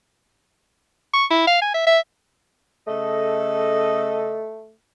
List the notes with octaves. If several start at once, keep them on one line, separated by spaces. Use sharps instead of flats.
C#6
E4
F5
G#5
E5
E5
C#3 A3 A4 D#5